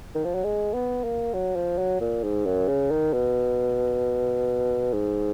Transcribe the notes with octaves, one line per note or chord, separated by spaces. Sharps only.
D#3
F3
F#3
G#3
B3
A#3
F#3
F3
F#3
A#2
G#2
F#2
C#3
D#3
B2
G#2